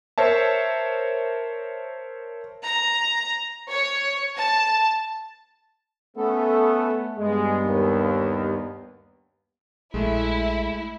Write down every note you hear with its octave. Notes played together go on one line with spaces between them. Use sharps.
A#4 C5 C#5 E5 A5
A#5
C#5
A5
A3 B3 C#4 A4
G2 G#3 B3
D#2
A#1 G#3 A3 E4